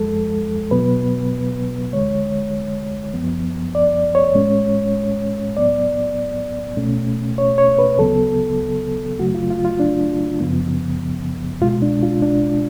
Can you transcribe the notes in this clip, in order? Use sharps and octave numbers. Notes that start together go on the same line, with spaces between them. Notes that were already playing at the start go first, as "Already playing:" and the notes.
Already playing: F#2 F3 G#3 A4
B2 F#3 B3 B4
D2 D3 G#3 C#5
F#2 F3 B3
D5
C#5
A2 G#3 C#4
A2 F#3 B3 D5
C#2 B2 A3 C#4
C#5
C#5
B4
D2 C#3 F#3 B3 A4
F#2 C#3 F#3 A3 F#4
F4
F4
F4
D4
F#2 C#3 F3 B3
C#2 B2 G#3 F4
D4
F4
D4